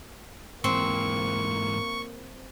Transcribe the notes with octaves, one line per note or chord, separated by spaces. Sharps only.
G#2 E3 A#3 C4 C#6